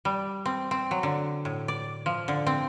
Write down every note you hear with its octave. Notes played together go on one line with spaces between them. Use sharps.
G3
C4
C4
F#3
D3
A2
D5
F3
D3
C4